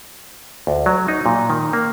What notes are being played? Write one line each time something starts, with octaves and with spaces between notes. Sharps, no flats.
D2
F#3
D#4
A#2
D#3
A#3